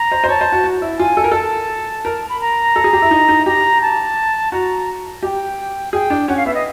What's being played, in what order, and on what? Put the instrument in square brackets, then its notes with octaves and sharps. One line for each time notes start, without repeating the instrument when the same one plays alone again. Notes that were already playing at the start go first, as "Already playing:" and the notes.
Already playing: [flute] A#5
[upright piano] C5
C5
[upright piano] C#5 [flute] A5
[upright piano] C5
F#4
F#4
E4
[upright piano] F4 [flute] G#5
[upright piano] A4
A#4
[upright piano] A4 [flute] A5
[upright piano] A#4
[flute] B5
A#5
[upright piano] A4
G#4
G4
E4
D#4
D#4
[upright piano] G4 [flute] A#5
[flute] A5
[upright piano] F#4 [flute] A#5
[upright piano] G4 [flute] G5
[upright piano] G#4 [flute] G5
[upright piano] D4
[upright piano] C#4 [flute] F#5
[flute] F5
[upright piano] B3 [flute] E5
[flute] D#5